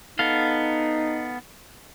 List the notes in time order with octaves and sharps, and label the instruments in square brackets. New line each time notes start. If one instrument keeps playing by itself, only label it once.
[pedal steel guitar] B3 A4 F5 [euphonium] D#4